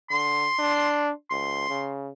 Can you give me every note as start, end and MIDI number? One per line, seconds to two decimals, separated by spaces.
0.10 0.47 50
0.10 1.07 84
0.58 1.11 62
1.30 1.68 37
1.30 1.85 84
1.69 2.10 49